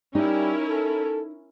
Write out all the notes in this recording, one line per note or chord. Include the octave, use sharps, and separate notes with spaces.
G3 C#4 D#4 E4 A#4
A4